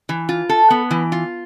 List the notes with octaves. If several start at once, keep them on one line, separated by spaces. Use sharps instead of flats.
E3
F4
A4
B3
E3
F4